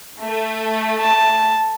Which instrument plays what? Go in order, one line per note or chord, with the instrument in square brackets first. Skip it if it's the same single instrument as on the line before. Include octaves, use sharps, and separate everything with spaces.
[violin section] A3
[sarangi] A5